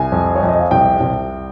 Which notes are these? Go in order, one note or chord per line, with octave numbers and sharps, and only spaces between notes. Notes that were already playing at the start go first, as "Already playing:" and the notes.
Already playing: C2 G#5
F2
C#5
F2
D#5
F5
C2 G5
C2